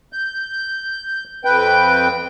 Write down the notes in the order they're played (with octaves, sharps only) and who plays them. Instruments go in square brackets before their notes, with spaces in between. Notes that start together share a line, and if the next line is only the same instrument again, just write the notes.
[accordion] G6
F2 B4 G5 G6